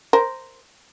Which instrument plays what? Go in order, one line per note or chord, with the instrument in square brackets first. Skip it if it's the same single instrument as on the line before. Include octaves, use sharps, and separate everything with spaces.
[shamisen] A#4 C5